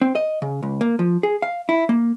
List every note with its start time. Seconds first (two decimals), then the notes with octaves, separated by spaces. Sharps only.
0.01 C4
0.15 D#5
0.42 C#3
0.63 C#2
0.81 A#3
0.99 F3
1.23 G#4
1.42 F5
1.69 E4
1.89 A#3